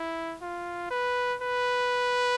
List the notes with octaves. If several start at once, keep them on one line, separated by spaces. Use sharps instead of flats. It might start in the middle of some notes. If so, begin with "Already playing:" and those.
Already playing: E4
F4
B4
B4